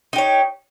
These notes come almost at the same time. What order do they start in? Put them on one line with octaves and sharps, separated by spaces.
D#4 G4 C#5